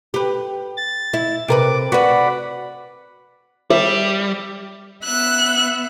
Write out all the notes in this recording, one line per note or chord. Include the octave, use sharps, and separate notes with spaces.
G4 B4
A6
E4
C3 A#4 B4 D6
F#4 B4 D5 F#5 B5
G3 E5
B3 E5 F#6